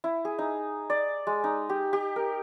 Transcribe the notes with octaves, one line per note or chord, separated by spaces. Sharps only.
E4
G#4
D#4
D5
G#3
D#4
G4
G4
A#4